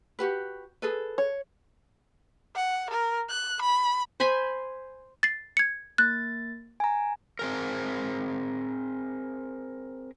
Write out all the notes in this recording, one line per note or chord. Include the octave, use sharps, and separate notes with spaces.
F#4 G4 B4
G#4 A4 B4
C#5
F#5
A#4
F#6
B5
C5 G#5 B5 C6
A6 C7
G#6 C#7
A#3 F#6 A6
G#5 A#5
C4 G#4 A#4